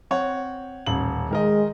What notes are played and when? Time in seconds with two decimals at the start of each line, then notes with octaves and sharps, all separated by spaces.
0.11 C4 C#5 F#5
0.86 D#1 A1 F#7
1.31 D#3 G#3 A#4 D#5